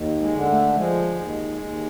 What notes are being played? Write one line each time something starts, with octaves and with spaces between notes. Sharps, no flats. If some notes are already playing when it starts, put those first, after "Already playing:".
Already playing: D#2
G#3
D3
A3
F3 G#3
D#2
D#2